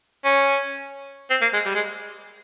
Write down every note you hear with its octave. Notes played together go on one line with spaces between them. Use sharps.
C#4
C4
A#3
G#3
G3
G#3